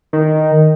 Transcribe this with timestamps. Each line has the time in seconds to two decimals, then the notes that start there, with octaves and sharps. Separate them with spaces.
0.13 D#3